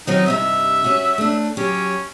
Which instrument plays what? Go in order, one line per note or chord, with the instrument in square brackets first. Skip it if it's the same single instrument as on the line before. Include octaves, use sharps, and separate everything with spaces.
[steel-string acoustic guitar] D#3 F#3 C4 [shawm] D#4
[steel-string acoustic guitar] G2 C3 D#4 [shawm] E5
[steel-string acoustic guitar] C#4 F#4
A3 D4
[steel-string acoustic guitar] F#3 G4 [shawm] C#4